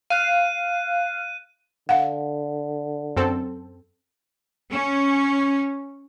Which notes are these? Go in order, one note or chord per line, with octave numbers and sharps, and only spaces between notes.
F5 F#6 D#7
D3 F5 F#5
F#2 C4 A4
C#4